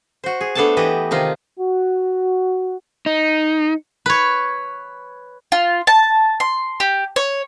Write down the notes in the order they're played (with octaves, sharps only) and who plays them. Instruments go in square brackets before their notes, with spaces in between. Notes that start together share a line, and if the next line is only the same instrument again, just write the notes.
[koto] F#4 C5
G#4
A3 B3 D4 A4 C5 A5
E3 G4 B4 D#5
C3 D#3 D#4 F4
[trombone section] F#4
[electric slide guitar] D#4
[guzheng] B4 C#5
[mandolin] F4
A5
C6
G4
C#5